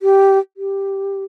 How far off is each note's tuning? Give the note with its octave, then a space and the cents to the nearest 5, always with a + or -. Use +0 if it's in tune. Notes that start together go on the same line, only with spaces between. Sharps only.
G4 -10
G4 +5